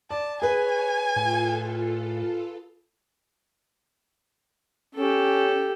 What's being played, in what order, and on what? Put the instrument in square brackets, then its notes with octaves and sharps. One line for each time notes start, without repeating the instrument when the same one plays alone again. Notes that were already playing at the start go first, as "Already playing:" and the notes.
[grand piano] D5 [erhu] A5
[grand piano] G#4 B4 [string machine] C#5 [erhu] G#5
[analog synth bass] A2 [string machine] F4 A4
[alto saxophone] C#4 [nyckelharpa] G4 A4